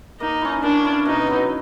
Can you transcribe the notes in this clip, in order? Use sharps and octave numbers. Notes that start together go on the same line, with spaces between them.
A#3 D#4
C#4 E4
A#3 D4
C#4 E4
B2 D#4
F#3 B3